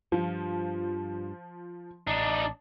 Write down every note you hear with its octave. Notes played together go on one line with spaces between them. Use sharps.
G2 F3
A1 D4 D#4